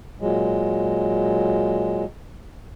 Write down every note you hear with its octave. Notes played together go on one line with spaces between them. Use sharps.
A#2 F#3 G#3